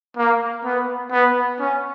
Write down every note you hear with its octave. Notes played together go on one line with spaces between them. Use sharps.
A#3
B3
B3
C#4